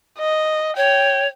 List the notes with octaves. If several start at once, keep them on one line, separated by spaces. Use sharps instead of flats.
D#5
C#5 G5